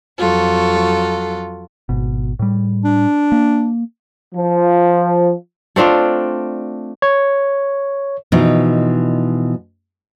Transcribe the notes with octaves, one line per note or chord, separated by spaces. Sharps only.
F2 F#3 F4 A4
G#1 B2
A2 G3
D4
A#3
F3
A3 C4 D4 F4
C#5
B2 E3 F3 D#4